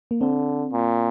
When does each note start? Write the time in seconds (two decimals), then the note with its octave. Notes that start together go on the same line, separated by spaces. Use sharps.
0.11 A#3
0.21 D3 C4
0.72 A#2